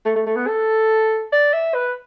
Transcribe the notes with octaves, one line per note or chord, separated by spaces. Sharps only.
A3
A3
A3
B3
A4
D5
E5
B4